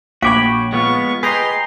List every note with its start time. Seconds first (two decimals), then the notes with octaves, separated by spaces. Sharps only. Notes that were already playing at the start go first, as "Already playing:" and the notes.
0.22 A#1 F#4 C#5 F5 G5 B5 D6
0.72 G#3 B3 F4 C#6
1.23 G#4 B4 D#5 G5 A#5 C6